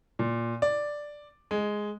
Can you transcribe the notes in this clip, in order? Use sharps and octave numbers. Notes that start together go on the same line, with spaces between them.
A#2
D5
G#3